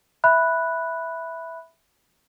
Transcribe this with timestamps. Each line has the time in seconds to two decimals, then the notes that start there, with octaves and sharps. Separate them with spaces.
0.24 E5 B5 F#6